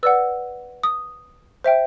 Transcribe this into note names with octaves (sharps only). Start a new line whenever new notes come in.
B4 D5 F#5 E6
D#6
C5 E5 G5